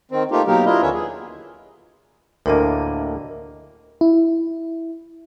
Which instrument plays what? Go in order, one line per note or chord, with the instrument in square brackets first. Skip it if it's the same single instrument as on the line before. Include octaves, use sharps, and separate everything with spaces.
[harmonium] D#3 C4
A3 A#3 D#4 F4 G4
B2 F#3 A#3 D#4 G4 A#4
D4 E4 F4 A#4 D#5
D#2 D3 C#4 B4 C#5 E5
G#4
[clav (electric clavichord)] D2 A2 A#3 [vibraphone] D4 D#5 [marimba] A#4
[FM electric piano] E4